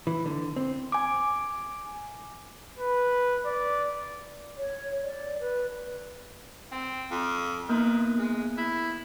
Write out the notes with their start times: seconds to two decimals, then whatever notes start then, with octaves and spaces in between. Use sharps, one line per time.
0.07 E3
0.26 D3
0.56 C4
0.92 G#5 D6
2.78 B4
3.46 D5
4.57 C#5
5.03 D5
5.40 B4
6.72 C4
7.11 F2
7.69 D#3 A#3 B3 F#6
8.19 G#3
8.58 E4